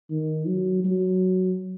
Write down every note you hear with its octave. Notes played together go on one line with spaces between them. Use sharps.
D#3
F#3
F#3